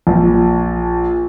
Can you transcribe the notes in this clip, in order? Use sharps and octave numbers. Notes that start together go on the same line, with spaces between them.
A#1